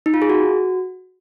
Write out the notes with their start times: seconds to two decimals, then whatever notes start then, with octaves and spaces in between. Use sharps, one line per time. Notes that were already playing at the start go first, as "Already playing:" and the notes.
0.06 D#4
0.14 F4
0.22 G#4
0.30 F#4